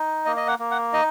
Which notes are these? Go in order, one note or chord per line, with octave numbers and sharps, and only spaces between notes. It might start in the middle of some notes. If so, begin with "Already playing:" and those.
Already playing: D#4
A#3 D#5
D#5
F#5
A#3
F#5
D#4 D#5